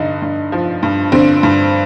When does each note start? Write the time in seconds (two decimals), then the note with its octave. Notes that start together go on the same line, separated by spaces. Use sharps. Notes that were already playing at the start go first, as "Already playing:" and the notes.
Already playing: G2 D3 D#4
0.22 G2
0.52 F3
0.83 G2
1.12 D3 C4
1.43 G2